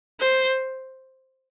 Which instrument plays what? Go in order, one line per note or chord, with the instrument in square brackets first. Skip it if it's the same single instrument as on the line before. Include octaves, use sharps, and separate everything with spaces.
[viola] C5